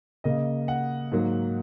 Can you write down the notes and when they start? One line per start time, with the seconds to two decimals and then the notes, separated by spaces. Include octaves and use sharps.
0.24 C#3 A#3 D#5
0.68 F#5
1.12 G#2 F#3 A#3